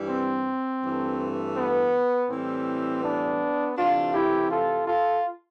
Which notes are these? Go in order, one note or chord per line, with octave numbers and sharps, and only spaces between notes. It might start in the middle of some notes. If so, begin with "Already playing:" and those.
Already playing: G2 E3 G3
C4
G2 E3 A3
B3
A2 E3 G3 C4
B3 D4
C3 E3 A3 D4 F4
E4 G4
F4 A4
F4 A4